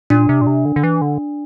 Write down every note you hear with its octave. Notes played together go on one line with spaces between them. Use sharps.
A#2 D4
C3
A#2
C3
D3
D3
E3
D3